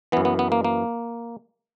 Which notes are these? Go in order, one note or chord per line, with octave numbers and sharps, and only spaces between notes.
F#2 E3 B3
B3
B3
A#3
A#3